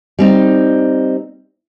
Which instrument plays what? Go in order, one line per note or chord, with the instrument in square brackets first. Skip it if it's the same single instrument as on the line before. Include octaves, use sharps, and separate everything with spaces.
[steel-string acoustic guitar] G3 C4 D#4